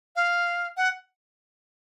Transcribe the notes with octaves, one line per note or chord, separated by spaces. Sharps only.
F5
F#5